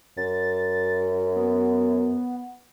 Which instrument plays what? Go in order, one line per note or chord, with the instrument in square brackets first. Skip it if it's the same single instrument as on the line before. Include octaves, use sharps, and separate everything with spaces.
[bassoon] F#2 [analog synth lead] A6
[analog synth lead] B3